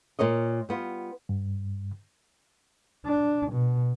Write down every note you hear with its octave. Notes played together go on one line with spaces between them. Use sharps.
A#2 A#4 C#5 D#5
G3 B3 F4
G2
D4
B2